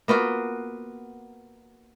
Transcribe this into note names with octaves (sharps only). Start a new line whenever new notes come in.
A#3 B3 F4 F#4